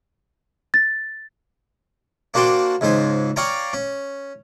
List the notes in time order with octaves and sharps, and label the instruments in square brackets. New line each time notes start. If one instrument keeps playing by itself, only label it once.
[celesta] A6
[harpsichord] A#3 D4 F#4 C5 G5 A5
C#2 G#2 C5 G#5
C#5 D5 F5 G5 G#5 A#5
C#4